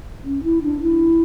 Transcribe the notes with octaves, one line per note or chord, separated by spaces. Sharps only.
C#4
E4
D4
E4